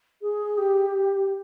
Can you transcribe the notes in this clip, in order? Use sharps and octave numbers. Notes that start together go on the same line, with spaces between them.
G#4
G4